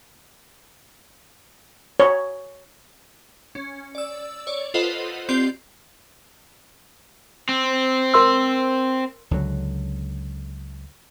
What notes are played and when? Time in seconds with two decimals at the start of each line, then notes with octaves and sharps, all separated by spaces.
2.00 C#5
3.55 C#4
3.95 D5 E6
4.47 C#5 D5
4.74 F4 A4 B4 C5 D#5 F#5
5.29 C4 F4 G4 D5 C6 G6
7.49 C4
8.14 A#4 C6 E6
9.31 C#2 D3 F#3